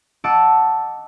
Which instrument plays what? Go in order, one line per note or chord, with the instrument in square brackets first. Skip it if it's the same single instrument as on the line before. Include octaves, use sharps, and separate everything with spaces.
[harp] D#5 F#5 A5 D6 E6 D7